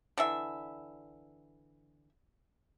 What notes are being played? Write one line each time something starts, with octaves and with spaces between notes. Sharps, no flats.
D3 E3 E5